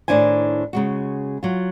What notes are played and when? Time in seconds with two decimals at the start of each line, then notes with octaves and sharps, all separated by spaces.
0.08 A2 D#3 D4 E4 C5 G#5
0.73 C#3 G#3 F#4
1.43 F#3 F4